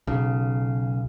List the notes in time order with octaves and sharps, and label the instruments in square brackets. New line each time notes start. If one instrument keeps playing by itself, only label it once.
[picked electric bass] B1 C#3